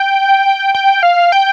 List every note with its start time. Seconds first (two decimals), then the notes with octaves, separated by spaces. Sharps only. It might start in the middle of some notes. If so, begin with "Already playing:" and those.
Already playing: G5
0.75 G5
1.03 F5
1.32 G5